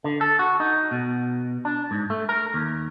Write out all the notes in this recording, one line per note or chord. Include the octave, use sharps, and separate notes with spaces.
D3
A4
F#4
D#4
B2
D4
G#2
A3
A#4
D#2